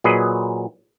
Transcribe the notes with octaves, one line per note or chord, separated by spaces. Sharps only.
A#2 F#3 G#4 B4 D#5